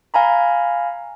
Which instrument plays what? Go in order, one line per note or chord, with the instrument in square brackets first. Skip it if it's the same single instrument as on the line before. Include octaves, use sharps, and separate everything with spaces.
[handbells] F5 G#5 A#5 B5